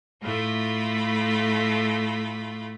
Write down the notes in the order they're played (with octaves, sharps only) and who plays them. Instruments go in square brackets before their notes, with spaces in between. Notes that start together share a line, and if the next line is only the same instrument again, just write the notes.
[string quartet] A2 A3 F4 B5